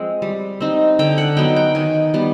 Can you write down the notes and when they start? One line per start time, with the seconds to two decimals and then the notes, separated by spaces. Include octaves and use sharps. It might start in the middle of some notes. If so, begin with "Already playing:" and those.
Already playing: F3 G#3 C4
0.22 G3
0.61 C4 D#4
0.99 D3 G5
1.18 F#5
1.37 F#3 B3 D#4 G5
1.56 G5
1.75 D#3 G#5
2.14 G3 B3